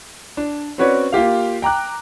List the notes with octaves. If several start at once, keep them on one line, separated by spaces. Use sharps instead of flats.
D4
C4 C#4 F#4 B4 C#5 D5
A#3 F4 G4 F5
G5 A#5 D6 F#6